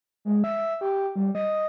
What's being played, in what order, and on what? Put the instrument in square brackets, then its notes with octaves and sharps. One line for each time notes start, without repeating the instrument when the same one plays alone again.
[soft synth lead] G#3
E5
G4
G3
D#5